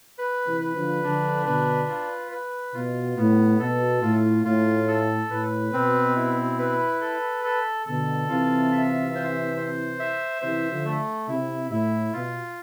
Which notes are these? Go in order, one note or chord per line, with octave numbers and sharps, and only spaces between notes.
B4
C3 E3
B4
D3 F3
D3 F3 D4
B2 D3 B4
F4
B4
B2 F4
A2 B3
B2 A4
A2 F4
A2 F4
A4
A2 B4
B2 C4
E4
B4
A4
A4
B2 D3 A4
C3 E3 F4
E5
C5
C5
E5
C3 E3 C5
D3 F3
A3
C3 E4
A2 E4
B2 F4